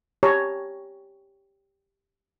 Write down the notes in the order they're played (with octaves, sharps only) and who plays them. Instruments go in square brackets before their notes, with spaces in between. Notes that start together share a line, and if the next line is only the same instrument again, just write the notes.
[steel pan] G4 C#5 A5 A#5